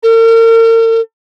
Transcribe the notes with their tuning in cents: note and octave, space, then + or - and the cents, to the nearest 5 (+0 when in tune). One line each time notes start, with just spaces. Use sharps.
A#4 -40